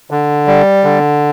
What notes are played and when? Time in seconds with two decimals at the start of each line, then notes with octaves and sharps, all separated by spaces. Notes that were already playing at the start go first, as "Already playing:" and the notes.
0.11 D3
0.48 G3
0.84 D3